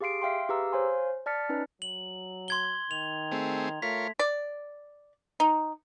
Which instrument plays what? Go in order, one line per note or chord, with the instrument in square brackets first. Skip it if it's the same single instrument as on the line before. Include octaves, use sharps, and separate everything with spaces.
[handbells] G4 G#4 F5 C6 C7 D7
E5 F5 G5 C6
G4 G#4 B4 F5 A#5 E6
C5 C#5 F5 G#5 C6
D5 A5 F6 A6 B6 C#7
C#4 D#4 B4 D5
[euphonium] F#3 [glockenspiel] F#7
[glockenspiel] C6 G#6 G7
[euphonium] D#3 [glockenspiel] F7
[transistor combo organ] A3 C4 G#4
[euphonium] A3 [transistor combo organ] F4 A#4 C#5 [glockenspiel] B6
[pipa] D5
D#4